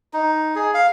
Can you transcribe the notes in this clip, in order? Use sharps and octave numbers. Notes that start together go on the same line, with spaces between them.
D#4
G#4
F5